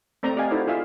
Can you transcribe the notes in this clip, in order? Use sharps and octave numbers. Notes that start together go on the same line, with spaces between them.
A3 C4 D5 A#5
G4 D5 D#5 F5 G#5
D#4 E4 F#4 A4 C5 D5
F4 G#4 D5 E5 F5